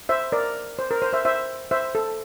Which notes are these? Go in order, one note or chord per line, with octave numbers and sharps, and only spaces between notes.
C5 E5
A#4 D5
C5
A#4
C5
C5 E5
C5 E5
C5 E5
A4